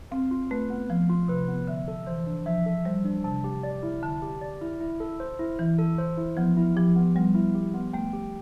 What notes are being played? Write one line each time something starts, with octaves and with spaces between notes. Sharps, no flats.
C4 F5
F4
A3 B4
B3
F3 F5
F4
C3 B4
B3
D3 E5
A4
E3 C5
D4
F3 E5
A4
G3 C5
D4
C3 A5
G4
D5
E4
D3 A5
G4
D5
E4
E4
A4
C5
E4
E3 E4
A4
C5
E4
F3 B3
E4
F3 G4
B3
G3 B3
E4
G4
B3
A3 G5
G4